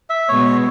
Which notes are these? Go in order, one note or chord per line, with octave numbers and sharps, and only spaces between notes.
E5
B2 G#3 B3 C#5